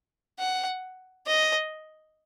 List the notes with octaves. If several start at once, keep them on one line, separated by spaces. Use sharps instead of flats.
F#5
D#5